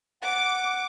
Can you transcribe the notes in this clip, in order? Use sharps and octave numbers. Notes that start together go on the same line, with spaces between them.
F#5 D6